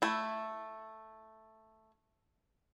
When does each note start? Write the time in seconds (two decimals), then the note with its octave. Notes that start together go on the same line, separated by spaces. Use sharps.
0.02 A3 E4